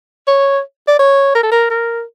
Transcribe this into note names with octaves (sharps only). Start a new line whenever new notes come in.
C#5
D5
C#5
A#4
A4
A#4
A#4